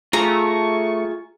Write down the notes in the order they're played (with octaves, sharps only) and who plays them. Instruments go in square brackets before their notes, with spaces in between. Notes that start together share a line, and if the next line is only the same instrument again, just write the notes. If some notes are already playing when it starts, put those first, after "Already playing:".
[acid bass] A3 [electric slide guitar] F4 G#4 [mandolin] A#5 [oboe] C#6